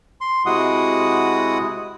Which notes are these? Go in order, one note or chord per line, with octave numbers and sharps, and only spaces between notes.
C6
C3 G#3 E4 F#4 F#5 D#6